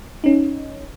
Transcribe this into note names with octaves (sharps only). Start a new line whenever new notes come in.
C#4 D#4